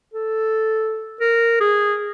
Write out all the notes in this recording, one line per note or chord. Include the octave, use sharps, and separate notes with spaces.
A4
A#4
G#4